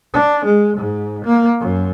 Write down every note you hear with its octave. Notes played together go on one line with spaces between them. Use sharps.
D4
G#3
G#2
A#3
F#2